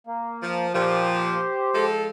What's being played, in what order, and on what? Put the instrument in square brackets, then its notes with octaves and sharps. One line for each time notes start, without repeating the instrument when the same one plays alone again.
[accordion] A#3
[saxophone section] F3
[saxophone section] A#2 F3 [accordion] G4 C5
[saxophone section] F3 G#3 A4